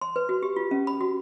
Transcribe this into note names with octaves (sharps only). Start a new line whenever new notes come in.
C6
B4
F#4
G4
F4
C#4
B5
F#4